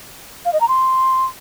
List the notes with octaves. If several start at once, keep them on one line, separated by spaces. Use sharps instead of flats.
F5
D#5
A#5
C6